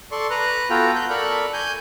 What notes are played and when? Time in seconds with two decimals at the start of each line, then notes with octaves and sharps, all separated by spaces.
0.12 A4 D5 C6 C#6
0.30 B4 A#5 F#6
0.70 B3 F4 F#4 A4 G5 A#5
0.95 F#6 G6
1.10 A4 A#4 D5 B5 C#6
1.54 G#5 G6